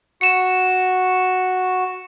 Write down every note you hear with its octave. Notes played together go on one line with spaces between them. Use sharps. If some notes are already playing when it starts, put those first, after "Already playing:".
F#4 C#7 E7